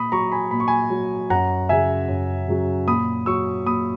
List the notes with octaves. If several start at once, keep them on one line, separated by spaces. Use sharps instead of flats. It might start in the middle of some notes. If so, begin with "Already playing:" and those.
Already playing: A#2 B5 D#6
F#3 A#5 C#6
G#5 B5
A#2 B5
C#6
G#5 B5
F#3
F#2 F#5 A#5
C#3 F#3 E5 G#5
F#2
C#3 F#3
A#2 B5 D#6
F#3 C#6 E6
A#2 B5 D#6